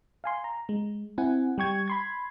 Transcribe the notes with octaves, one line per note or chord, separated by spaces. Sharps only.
F5 G#5 C6
A#5
G#3
C4 E4 F#5 G#5
G3 G5 C#6 G#6
B5 C6 G#6